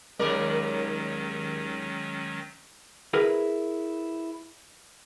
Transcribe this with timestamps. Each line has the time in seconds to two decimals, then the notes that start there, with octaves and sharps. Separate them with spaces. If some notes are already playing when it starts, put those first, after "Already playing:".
0.19 D#2 D#3 F#3 G#3 C#4 A#4 D5
3.13 E4 G#4 A#4 B4